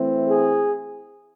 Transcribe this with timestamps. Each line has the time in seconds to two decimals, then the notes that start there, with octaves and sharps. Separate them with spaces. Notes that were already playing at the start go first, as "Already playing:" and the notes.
Already playing: E3 A3 C4
0.30 G#4